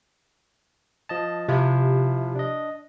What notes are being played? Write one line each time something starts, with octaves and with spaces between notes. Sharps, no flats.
F3 D#5 A5
C3 F3 E4 F4
D4 D#5